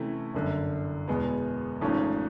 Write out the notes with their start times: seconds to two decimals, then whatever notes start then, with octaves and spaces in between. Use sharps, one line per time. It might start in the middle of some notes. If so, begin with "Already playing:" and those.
Already playing: C3 E3 A3 C#4 E4
0.34 G1 F#2 D3
1.08 E2 B2 G#3 B3
1.81 G#1 G#2 F3 A3 C#4